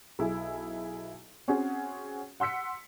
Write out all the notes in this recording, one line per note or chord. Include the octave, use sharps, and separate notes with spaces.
B1 E4 G#4
C4 C#4 F#4 G#4
F#5 C6 E6 B6 C#7